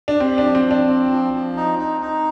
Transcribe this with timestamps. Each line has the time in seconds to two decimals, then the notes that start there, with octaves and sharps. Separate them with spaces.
0.08 D4
0.20 C4 G4
0.38 F3 D4
0.55 C4
0.65 F3
0.71 D4
0.88 C4
1.11 F3
1.33 F3
1.57 D#4
1.79 D#4
2.01 D#4